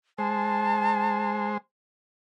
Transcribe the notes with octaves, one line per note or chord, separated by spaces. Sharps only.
G#3 C5 A5